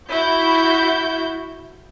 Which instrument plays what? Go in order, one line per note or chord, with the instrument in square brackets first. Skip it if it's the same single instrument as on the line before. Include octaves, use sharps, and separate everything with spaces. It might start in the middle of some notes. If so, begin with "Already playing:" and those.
[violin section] E4 F#4 G6